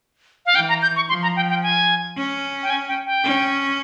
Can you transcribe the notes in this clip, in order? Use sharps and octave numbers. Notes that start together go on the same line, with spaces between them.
F5
E3 G5
A#5
G6
C#6
F3 C6
A#5
G5
G5
G#5
C#4
G5
G#5
G5
G5
C#4